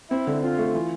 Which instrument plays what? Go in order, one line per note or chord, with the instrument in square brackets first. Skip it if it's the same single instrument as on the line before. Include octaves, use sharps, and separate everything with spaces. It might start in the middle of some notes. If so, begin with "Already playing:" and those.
[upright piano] C4 [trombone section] E4
[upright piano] D3
[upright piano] C4 [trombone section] F4
[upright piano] A3
E3